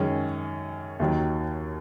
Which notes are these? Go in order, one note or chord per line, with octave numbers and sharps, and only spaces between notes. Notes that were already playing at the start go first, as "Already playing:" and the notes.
Already playing: F#2 D#3 G#3 C#4
D#2 D#3 F#3